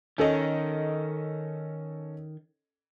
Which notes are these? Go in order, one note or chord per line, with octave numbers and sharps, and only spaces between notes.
D#3 C#4 A4 D#5